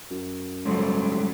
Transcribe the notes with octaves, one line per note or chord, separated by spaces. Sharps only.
F#2
G#2 C#3 F#3 G3 A3